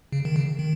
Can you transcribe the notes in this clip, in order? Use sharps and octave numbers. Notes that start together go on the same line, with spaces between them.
C#3
D#3
C#3
D#3